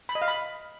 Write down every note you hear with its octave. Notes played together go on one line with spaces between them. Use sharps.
B5
D#5
F5
B5